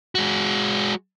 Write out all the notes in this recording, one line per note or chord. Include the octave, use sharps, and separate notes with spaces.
G#3 F#4